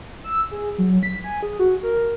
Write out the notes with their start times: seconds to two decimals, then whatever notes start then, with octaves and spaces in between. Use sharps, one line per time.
0.24 E6
0.51 G#4
0.78 F#3
1.03 B6
1.24 G#5
1.43 G#4
1.59 F#4
1.83 A#4